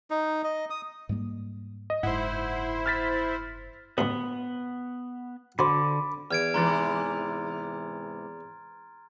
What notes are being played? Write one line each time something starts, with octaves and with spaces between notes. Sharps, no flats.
D#4
D#5
D#6
G#2 G3 A#3
D#5
F#1 G#2 E4 C5 F#5
F6 A6 B6
A1 D2 G2 B3
D3 F#4 C5 B5 D6
E2 F6 G#6 D7
G#2 C3 E3 A#5 C6 A6